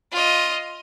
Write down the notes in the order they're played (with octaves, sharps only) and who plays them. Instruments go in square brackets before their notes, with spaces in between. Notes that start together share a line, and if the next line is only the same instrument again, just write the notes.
[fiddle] F4 D#5